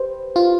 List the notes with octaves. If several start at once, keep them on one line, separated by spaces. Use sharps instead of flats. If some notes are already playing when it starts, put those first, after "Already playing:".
Already playing: G4 B4 C5
F4